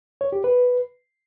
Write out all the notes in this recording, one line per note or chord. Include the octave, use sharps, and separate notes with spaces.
C#5
G4
B4